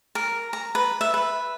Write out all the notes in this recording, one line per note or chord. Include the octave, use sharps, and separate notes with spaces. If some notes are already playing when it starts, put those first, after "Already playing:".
A#4
A#5
B4
E5
B4